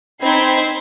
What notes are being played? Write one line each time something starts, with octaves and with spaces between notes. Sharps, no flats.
C4 D#4 C5 B5 G#6 C7